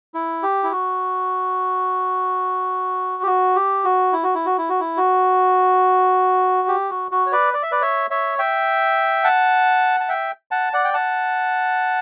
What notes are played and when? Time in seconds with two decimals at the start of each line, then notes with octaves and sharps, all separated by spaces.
0.14 E4
0.43 G4
0.63 E4
0.72 F#4
3.23 G4
3.27 F#4
3.56 G4
3.84 F#4
4.13 E4
4.23 F#4
4.35 E4
4.46 F#4
4.58 E4
4.69 F#4
4.80 E4
4.97 F#4
6.68 G4
6.90 F#4
7.11 F#4
7.26 C#5
7.32 B4 D5
7.54 D5
7.63 E5
7.72 B4 D5
7.81 C#5 E5
8.10 C#5 E5
8.39 E5 G5
9.24 F#5 A5
10.00 A5
10.09 E5 G5
10.51 F#5 A5
10.73 D5 F#5
10.84 G5
10.94 F#5 A5